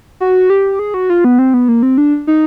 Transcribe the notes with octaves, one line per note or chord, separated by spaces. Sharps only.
F#4
G4
G#4
F#4
F4
B3
C4
B3
A#3
C4
D4
D#4